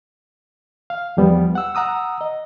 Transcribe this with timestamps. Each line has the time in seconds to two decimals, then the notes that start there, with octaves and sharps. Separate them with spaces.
0.90 F5
1.17 E2 F3 G3 B3
1.55 F#5 E6
1.75 F#5 A#5 D#6 E6
2.21 D#5